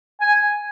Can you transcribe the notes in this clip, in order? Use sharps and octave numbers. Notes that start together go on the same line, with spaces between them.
G#5